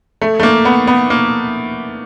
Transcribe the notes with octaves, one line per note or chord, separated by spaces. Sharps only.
A3
A3
A#3
B3
B3
A#3